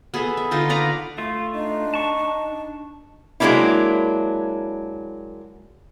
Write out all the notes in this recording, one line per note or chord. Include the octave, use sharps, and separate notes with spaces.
B3 G#4 A4 E5
E5
D3 D#4 F4 A4
B4 D5 F5 A#5
A3 F4 F5
D4 D#4
A5 C#6
F#3 G#3 A#3 C#4 D4 E4